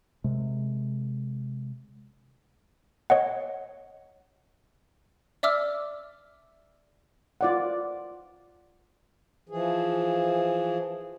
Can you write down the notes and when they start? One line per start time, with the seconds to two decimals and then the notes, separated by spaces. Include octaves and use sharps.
0.24 C3 G#3
3.10 C#5 D#5 F#5
5.43 D5 E5 D6 E6 F6
7.41 F4 D5 F#5
9.49 E3 F3 G#4